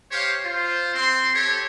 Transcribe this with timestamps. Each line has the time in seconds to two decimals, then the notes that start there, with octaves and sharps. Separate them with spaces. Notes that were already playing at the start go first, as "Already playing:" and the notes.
0.11 G4 C5 C#5 F5
0.44 F4 C5
0.95 C4 C6
1.34 G4 A4 C#5